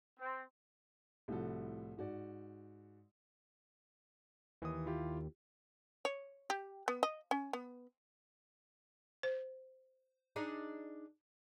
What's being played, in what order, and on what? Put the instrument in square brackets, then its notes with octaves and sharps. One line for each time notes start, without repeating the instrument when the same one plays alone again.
[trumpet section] C4
[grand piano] C2 A2 F3 F#4 A4
G#2 F#4 D5
[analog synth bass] D#2 [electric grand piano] E3 D#6
[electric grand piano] E4 F4 G4
[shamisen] C#5
G4
B3
D#5
C#4
B3
[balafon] C5
[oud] D4 D#4 G#4